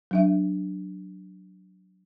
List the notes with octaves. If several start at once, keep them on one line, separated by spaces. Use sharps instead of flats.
F#3 D4 E5